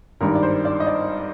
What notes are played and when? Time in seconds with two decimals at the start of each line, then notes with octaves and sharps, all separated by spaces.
0.21 G#1 G2 D#3 A#4
0.35 D5
0.43 C5
0.65 D5
0.80 D#5
0.87 D5